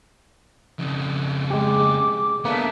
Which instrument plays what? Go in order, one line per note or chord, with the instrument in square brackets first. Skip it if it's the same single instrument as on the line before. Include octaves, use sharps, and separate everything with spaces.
[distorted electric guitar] F2 C#3
[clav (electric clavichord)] G#3 G4 [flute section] D6
[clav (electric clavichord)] A#3 [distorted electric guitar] B3 D4 [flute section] A4 E5